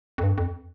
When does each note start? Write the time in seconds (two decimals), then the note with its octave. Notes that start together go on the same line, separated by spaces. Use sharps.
0.18 F2
0.23 G2
0.38 F2